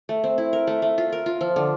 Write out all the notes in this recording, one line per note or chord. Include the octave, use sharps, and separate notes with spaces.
A3
C4
E4
A#4
A3
A3
F4
A#4
F4
F3
D3